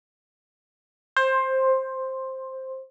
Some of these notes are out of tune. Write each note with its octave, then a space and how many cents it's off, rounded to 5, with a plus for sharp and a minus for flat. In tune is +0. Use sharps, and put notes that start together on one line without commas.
C5 +10